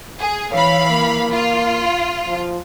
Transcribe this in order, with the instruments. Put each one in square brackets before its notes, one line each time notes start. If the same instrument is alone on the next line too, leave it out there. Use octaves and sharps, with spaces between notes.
[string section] G#4
[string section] E3 F5 B5 [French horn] C#5
[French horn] A#3
[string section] F4
[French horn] F3